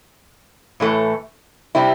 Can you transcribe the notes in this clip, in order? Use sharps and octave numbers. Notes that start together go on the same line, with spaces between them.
A2 E3 A3
C3 G3 C4 E4